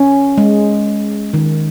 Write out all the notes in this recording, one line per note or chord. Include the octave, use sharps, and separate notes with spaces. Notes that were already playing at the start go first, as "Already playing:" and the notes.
Already playing: C#4
G#3
D#3